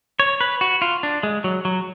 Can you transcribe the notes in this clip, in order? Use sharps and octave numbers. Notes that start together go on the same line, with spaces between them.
C#5
B4
F#4
F4
D4
G#3
F#3
F#3